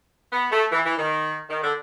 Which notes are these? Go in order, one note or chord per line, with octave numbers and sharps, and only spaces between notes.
B3
A3
E3
E3
D#3
D#3
D3